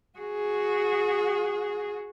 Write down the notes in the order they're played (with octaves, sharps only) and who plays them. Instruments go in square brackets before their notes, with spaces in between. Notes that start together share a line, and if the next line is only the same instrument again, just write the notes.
[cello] F#4 G#4